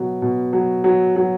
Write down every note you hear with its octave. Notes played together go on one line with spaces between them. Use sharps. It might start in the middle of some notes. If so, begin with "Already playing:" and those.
Already playing: B2 F#3
B2
F#3
F#3
F#3